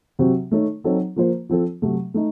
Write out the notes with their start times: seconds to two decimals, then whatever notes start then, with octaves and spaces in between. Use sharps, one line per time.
0.19 C3 F#3 C4 F#4
0.51 D#3 A3 D#4 A4 C#5
0.84 F#3 C4 D#4 A4 C#5
1.16 F3 A#3 F4 C5
1.49 F3 C4 F4 A4
1.82 C3 F#3 A3
2.14 A3 D#4